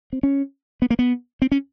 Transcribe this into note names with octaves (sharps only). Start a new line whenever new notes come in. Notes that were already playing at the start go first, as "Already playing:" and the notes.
C4
C#4
B3
A#3
B3
C4
C#4